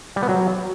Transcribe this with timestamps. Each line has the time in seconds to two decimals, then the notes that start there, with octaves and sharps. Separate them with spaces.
0.16 G3
0.23 B3
0.29 F#3